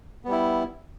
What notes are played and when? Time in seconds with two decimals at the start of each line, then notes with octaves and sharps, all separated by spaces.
0.25 B3
0.28 G3
0.32 E4